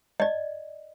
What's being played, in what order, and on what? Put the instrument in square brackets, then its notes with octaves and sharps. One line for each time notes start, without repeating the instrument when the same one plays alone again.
[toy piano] D5 D#5